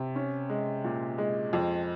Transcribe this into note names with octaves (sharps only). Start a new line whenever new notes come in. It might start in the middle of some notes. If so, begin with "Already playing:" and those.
Already playing: C3
C#4
G#3
A#2
G#3
F2